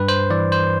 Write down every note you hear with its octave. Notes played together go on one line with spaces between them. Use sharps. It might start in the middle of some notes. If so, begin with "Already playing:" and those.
Already playing: G2 B4
C5
E3 D5
C5